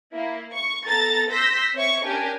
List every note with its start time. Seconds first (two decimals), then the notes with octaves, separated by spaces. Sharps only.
0.14 A#3 E4
0.54 C#6
0.88 B3 A4 A#5 A6
1.31 C6 E6 G6 A#6 B6
1.75 C4 C#5 E5 C#6
2.05 C#4 D4 G4 A#4 G#5